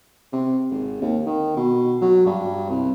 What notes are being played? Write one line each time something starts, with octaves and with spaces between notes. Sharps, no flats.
C3
G#1
D#2
D#3
B2
F#3
G2
C2